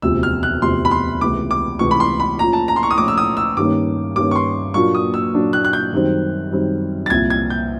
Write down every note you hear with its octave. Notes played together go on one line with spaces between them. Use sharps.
E1 D2 C3 F3 E6
F6
F#6
E1 D2 C3 F3 C6
B5
C6
C#2 C3 E3 A3 D6
D6
C#2 C3 E3 A3 C#6
B5
C6
B5
A#2 F3 A3 C#4 F4 A#5
A5
A#5
C6
C#6
D#6
A#2 F3 A3 C#4 F4 D6
E6
D#6
E6
G2 D#3 G3 A#3 C#4 D6
G2 D#3 G3 A#3 C#4 D6
C#6
C6
A#2 F#3 A#3 D4 F4 C#6
D#6
E6
A#2 F#3 A#3 D4 F4
F#6
F#6
G6
F#2 D#3 G3 C4
F#2 D#3 G3 C4
A6
C2 A#2 F3 G#6
G#6
G6